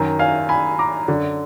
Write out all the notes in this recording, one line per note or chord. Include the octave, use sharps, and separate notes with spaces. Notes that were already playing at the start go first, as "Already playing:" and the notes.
Already playing: F#2 D#3
F5 G#5
G#5 B5
A#5 D6
F#2 D3